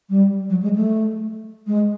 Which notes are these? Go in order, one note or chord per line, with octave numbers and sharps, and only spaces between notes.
G3
F#3
G#3
A3
G#3